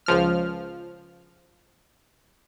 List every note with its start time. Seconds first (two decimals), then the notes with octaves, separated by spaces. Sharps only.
0.06 C#2 F3 F6